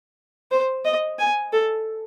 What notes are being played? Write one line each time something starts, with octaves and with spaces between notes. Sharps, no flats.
C5
D#5
G#5
A4